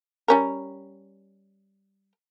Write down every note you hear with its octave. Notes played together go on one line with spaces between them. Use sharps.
G3 C#4 A#4